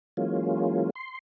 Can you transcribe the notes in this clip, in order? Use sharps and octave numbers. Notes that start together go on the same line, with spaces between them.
E3 F#3 G#3 A#3 C#4 F4
C6